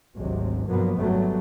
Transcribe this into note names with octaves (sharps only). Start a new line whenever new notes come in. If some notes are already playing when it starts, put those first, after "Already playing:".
G#1 D2 C3 F#3 G#3
G2 B2 F3 F#3 A#3 B3
G#1 F#2 F#3 G3 A3 B3